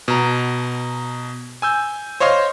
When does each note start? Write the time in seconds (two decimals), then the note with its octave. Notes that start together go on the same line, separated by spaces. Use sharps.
0.08 B2 A#5
1.62 G#5 E6 G6
2.20 C5 C#5 D#5 F5 C6